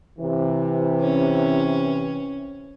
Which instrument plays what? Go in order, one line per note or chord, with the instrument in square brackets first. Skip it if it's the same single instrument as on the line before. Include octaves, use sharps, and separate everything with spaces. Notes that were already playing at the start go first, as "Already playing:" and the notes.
[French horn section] C3 E3
[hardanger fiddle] C#4